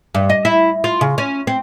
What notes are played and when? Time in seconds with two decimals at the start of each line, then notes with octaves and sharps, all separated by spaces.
0.15 G2
0.30 D#5
0.45 E4
0.84 F4
1.01 C#3
1.18 C#4
1.47 C4